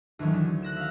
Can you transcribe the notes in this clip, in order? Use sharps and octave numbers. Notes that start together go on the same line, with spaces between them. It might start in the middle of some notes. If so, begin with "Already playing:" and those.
D2 D#3 E3 F#3 A3
D4
F#6 A#6 E7
E5 F5